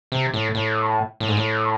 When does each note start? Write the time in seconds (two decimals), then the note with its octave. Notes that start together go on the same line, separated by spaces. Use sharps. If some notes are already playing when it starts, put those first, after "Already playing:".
0.12 C3
0.34 A2
0.55 A2
1.20 A2
1.28 G#2
1.37 A2